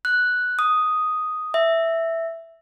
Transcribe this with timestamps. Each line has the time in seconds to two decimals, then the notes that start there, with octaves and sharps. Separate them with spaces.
0.05 F#6
0.59 D#6
1.54 E5